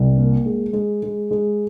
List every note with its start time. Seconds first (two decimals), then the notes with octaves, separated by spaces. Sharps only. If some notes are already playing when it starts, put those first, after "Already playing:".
Already playing: C2
0.17 A#3
0.46 G#3
0.73 G#3
1.03 G#3
1.31 G#3